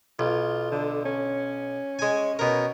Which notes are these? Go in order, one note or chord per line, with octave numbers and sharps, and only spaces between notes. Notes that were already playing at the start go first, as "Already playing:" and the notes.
B1 F4
D3
C#4
G#3 G#5
B2 C#4 A#4